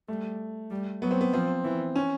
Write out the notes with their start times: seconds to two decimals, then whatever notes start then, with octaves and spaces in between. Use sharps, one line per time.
0.08 G3 A3
0.70 G3
1.02 F#3 B3
1.11 C4
1.21 B3
1.33 F3 C4
1.64 E3
1.96 C#4